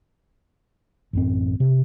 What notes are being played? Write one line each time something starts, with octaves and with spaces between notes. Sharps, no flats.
A1 F#2 C4
C3